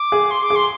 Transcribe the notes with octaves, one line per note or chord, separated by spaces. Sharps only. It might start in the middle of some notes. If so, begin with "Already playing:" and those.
Already playing: D6
G#4
C6
D6
G#4
C6